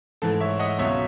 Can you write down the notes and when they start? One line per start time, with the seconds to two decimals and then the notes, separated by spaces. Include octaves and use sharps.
0.22 G#2 E3 A3 A4
0.41 C#5 E5
0.59 D#5 F#5
0.79 C#2 B2 F#3 C#5 E5